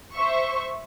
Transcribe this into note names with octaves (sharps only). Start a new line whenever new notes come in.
C5 E5 C#6